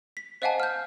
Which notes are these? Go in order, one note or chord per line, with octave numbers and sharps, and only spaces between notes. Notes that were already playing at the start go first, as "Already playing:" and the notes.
B6
C5 D#5 F5 F#5 G#5 A5
F6 G6